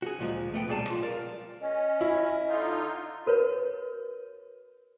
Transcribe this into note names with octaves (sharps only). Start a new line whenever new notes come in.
F#4 G#4
D2 A#2 F3 G#3
A3 B3 G5
B1 A#2 G3 G#4 D5 A5
F#3 F4
A#4 D5 F5
C#4 D#5
E4
D3 D#4 F4
F#4 A#4 B4 C#5